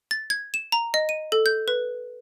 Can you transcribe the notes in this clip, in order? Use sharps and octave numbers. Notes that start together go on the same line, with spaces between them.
A6
G#6
E7
A#5
D#5
D#7
A4
G6
B4